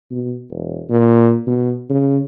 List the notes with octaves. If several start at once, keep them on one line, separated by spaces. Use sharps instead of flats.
B2
E1
A#2
B2
C#3